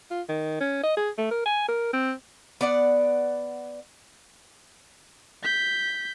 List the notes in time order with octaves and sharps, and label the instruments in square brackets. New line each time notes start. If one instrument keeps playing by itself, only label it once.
[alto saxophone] F4
D#3
C#4
D#5
G#4
A3
A#4
G#5
A#4
C4
[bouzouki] B3 D5 F#5
[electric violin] G6 B6